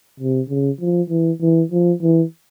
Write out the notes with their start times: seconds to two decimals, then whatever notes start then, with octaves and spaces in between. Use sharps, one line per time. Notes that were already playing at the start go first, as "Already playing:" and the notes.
0.20 C3
0.49 C#3
0.80 F3
1.10 E3
1.41 E3
1.71 F3
2.02 E3